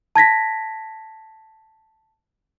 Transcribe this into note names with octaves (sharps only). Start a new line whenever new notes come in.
A5 G#6 A#6 B6